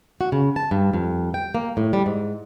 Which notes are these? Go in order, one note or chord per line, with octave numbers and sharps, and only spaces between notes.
F#4
C#3
A5
G2
F2
G5
A#3
A2
G3
G#2